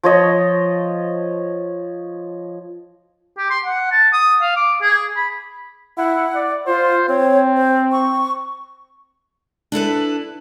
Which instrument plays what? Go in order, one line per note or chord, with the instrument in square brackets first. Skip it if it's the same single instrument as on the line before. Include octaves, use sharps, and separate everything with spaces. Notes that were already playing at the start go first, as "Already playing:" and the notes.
[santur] F3 C#5 D#5
[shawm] G4
C6
F#5
A5
D#6
F5
D6
G#4
B5
[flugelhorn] E4 [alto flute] F#5
[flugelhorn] D5
[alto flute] F4 [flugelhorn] C5
[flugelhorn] C4 [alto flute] C#5
[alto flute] C5
C#6
[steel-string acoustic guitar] D4 E4 A4 B4